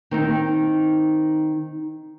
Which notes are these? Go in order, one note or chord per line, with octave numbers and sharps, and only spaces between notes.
D#3 C4 D#4